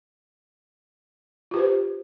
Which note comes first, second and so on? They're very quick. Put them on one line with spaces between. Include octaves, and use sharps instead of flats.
F4 G4 B4 C5